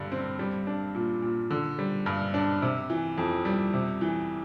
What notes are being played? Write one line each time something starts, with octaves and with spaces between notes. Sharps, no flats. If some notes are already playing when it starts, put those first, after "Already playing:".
Already playing: G2 D3 G3
C4
G3
D4
A#2
A#2
D3
G3
G2
D4
C3
E3
F2
G3
C3
E3